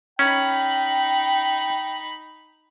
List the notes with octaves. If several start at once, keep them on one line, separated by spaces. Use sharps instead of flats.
C#4 D#4 G5 B5